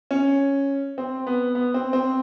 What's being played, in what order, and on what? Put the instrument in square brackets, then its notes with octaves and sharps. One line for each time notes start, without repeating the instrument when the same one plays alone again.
[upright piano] C#4
C4
B3
B3
C4
C4